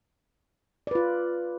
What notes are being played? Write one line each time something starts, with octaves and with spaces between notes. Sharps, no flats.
F4 B4 D5